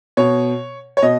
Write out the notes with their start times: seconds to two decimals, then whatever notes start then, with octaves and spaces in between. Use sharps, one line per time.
0.17 B2 C#5
0.97 C#5
1.02 B2 D#5